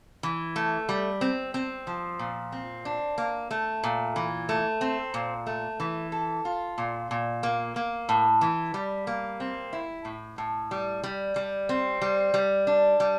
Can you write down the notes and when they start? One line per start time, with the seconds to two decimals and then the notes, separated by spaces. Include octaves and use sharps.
0.23 E3
0.56 A3
0.89 G3
1.21 C4
1.54 C4
1.87 F3
2.19 A#2
2.52 C4
2.85 D4
3.18 A#3
3.51 A3
3.84 A#2
4.16 E3
4.49 A3
4.81 C4
5.14 A#2
5.47 A3
5.80 E3
6.12 A4
6.45 F4
6.78 A#2
7.11 A#2
7.43 A#3
7.76 A#3
8.09 A2
8.41 E3
8.74 G3
9.07 A#3
9.40 C4
9.73 E4
10.05 A2
10.38 A2
10.71 G3
11.03 G3
11.36 G3
11.69 C4
12.01 G3
12.34 G3
12.67 D4
13.00 G3